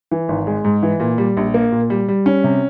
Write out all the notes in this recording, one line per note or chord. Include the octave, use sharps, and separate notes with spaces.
E3
G#1
G#3
G#2
E3
A#2
G3
A#1
A#3
A#2
G3
G3
C#4
C3